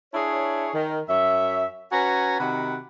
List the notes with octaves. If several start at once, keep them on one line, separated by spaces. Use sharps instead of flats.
D4 E4 G#4 C#5
D#3
F#2 C#5 E5
C#4 F#4 B4 G#5 A#5
C3 D#3 F#4 F#5 B5